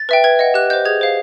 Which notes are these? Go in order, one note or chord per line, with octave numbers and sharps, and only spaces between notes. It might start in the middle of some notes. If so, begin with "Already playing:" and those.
Already playing: A6
B4 E5 G5
B4 G#6
D#5 F#5
G4 F#6
C5 D#5 G6
G#4 G#6
C5 F5